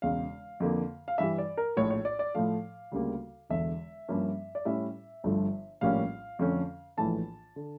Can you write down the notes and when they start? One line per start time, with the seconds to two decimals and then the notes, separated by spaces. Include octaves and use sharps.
0.02 E1 E2 C#3 F5
0.60 F2 D3 F3 A#3
1.08 F5
1.18 G2 E3 G3 E5
1.38 D5
1.57 A#4
1.76 A#1 A2 F3 C#5
1.90 C#5
2.05 D5
2.19 D5
2.35 A2 F3 A3 F5
2.92 D2 C#3 G3 A#3
3.49 E1 E2 D3 E5
4.08 G2 F3 A#3 C#4
4.55 D5
4.65 A2 G3 C#4 E4 E5
5.24 G1 G2 D3 F3 A3
5.81 A#1 A2 G3 A#3 C#4 F5
6.39 F2 D3 A3 C#4
6.97 A#1 A2 E3 A3 A5
7.56 D3